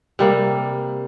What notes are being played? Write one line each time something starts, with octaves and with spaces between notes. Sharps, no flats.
C3 G3 A#3